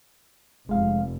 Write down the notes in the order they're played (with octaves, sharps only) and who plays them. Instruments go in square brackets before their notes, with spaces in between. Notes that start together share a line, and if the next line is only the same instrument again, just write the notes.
[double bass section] F1 [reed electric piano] G#3 F5